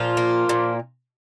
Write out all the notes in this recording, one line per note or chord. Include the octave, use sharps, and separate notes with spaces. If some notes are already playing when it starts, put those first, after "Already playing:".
Already playing: A#2 F3 F4
A#3
A#2